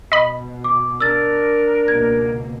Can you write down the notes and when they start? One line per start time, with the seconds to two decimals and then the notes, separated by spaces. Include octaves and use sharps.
0.12 B2 D#5 B5
0.64 D6
1.01 D4 A#4 E6 A6
1.88 C#2 B2 A#3 G#6